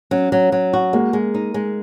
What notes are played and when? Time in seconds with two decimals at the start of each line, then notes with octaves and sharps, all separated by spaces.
0.11 F#3 C#4
0.32 F#3
0.52 F#3
0.73 F#4
0.93 G#3 A#3
1.13 G#3
1.34 D#4
1.54 G#3